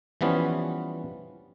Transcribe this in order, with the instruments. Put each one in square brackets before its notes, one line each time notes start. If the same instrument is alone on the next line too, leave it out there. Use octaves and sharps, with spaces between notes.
[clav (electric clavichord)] E3 F3 G3 B3 C#4